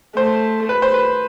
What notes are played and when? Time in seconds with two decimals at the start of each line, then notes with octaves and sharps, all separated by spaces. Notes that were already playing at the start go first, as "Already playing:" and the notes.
0.16 A3 C5
0.69 B4
0.82 C5
0.94 B4